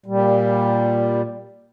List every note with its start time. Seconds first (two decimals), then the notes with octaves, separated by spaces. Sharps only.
0.06 A#2 G3